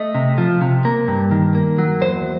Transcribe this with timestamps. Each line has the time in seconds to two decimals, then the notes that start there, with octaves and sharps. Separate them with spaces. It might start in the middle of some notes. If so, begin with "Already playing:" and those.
Already playing: A3 D#5
0.15 C3
0.38 F3
0.61 C3
0.85 A#3
1.08 G2
1.31 D#3
1.55 A#3
1.78 F#3
2.01 E2 C5